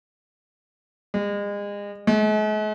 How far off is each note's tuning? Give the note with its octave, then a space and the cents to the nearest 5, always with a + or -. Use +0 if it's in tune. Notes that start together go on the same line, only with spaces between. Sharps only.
G#3 -35
G#3 +45